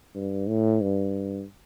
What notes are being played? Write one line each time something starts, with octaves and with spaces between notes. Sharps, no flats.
G2
A2
G2